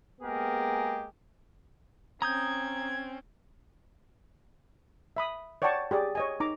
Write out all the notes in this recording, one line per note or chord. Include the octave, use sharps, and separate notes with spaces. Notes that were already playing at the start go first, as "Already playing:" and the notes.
G#3 A#3 B3 G4 G#4 A#4
C4 C#4 A#5 D#6 G6 G#6
E5 B5 D#6
C#5 D5 F#5 G5 A5 C#6
G4 G#4 D5
C#5 D#5 G#5
D#4 A#5 D6